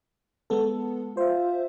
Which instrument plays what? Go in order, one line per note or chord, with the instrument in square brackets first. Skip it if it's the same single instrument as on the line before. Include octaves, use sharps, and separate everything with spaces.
[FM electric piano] G#3 B3 A4
[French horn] F4 [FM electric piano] C5 E5